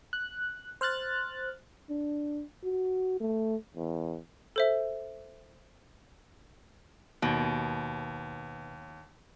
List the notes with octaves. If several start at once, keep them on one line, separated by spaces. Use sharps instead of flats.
F#6
C5 F6 F#6 A6
D4
F#4
A3
E2
A4 C5 E5
D#2 B2